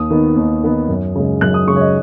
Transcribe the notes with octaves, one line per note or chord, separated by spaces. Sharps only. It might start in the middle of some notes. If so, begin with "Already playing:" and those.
Already playing: D#2 D#6
D#3 B3 D#4
D#2
D#3 B3 D#4
F#2
C#3 G#3
F#2 F#6
D#6
C#3 G#3 C#6
C#5
D#5